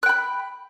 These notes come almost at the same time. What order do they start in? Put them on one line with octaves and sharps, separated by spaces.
F#6 G5 B5